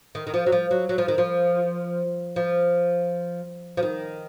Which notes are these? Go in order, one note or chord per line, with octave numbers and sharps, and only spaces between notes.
D#3
D#3
F3
F#3
F3
F#3
F#3
F3
D#3
F3
F3
F3
D#3